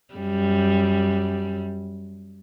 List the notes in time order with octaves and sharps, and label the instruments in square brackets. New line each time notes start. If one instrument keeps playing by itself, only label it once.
[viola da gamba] F#2 G3